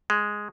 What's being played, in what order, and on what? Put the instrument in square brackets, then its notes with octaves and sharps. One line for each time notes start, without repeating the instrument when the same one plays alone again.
[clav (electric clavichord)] G#3